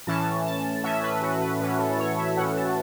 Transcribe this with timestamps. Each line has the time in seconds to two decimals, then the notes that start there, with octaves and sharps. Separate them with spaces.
0.07 A2 E3 C#4 A5
0.46 A5
0.83 A2 E3 C#4 E5
1.03 B4
1.22 F#4
1.41 B4
1.60 A2 E3 C#4 B4
1.79 A4
1.99 C#5
2.18 E5
2.37 A2 E3 C#4 F#5
2.56 A5